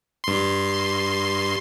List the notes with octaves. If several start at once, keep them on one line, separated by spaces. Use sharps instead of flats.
G2 C6